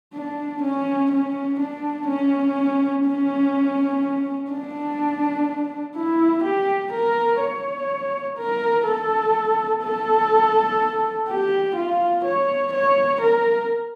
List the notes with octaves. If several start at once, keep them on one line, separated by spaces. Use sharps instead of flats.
D4
C#4
C#4
D4
C#4
C#4
D4
E4
G4
A#4
C#5
A#4
A4
A4
G4
F4
C#5
C#5
A#4